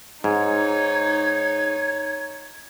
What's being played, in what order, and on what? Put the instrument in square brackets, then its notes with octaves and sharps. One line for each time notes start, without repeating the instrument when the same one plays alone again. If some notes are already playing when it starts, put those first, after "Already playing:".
[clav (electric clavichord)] G#2 [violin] D#4 C#5 [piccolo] G#6